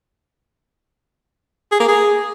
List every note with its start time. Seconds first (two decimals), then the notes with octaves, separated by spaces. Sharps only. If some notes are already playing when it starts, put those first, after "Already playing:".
1.72 G#4
1.80 A#3
1.88 G#4